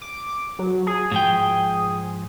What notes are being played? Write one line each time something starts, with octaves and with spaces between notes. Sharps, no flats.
D6
F#3
G#4
G#2 F3 G5